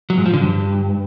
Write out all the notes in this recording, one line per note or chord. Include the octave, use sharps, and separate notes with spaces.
F#3
G#2
F3
D3
G2